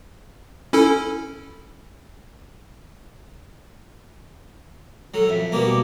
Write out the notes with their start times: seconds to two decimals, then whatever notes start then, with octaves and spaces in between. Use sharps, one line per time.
0.73 C#4 E4 A4
5.14 F#3 A4
5.29 F2 E5
5.52 B2 G3 A#3 D6